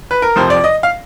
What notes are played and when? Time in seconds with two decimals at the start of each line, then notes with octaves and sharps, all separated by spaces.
0.11 B4
0.22 A#4
0.36 F2 C3 F3 C5
0.50 D5
0.64 D#5
0.83 F5